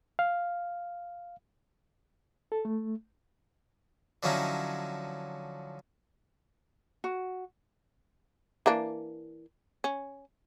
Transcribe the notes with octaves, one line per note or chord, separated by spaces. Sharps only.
F5
A4
A3
D3 F3 F#3 C#4 D#4 E4
F#4
E3 A#3 D4
C#4